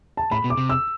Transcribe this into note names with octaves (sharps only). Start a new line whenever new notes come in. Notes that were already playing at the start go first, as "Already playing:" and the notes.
A5
A2 B5
B2
D6
C3
E6